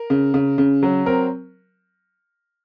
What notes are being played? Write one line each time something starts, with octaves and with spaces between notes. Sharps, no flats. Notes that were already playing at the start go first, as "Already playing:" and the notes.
Already playing: A#4
C#3
C#3
C#3
F#3
C4 A#4